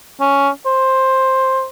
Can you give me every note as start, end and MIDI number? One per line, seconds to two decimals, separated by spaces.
0.20 0.49 61
0.66 1.67 72